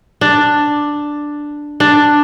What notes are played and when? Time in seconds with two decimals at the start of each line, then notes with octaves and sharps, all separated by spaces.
0.21 D4
1.80 D4